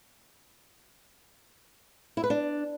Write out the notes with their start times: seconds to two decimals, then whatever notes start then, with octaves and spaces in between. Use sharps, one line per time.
2.17 E4
2.24 B4
2.30 D4